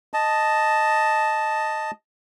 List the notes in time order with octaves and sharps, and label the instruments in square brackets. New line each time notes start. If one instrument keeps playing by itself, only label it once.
[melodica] D#5 A5